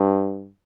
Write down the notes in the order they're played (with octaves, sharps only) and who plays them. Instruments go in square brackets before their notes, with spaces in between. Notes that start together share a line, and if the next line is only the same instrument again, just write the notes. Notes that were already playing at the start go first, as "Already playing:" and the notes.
Already playing: [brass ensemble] G2